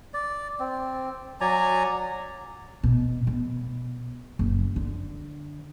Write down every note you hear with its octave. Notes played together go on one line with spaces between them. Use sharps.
D5
C4
F#3 D5 G#5 A#5
B2
B2
F#1
D3